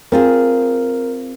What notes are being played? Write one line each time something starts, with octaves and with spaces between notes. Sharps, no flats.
C4 F4 G#4 A#4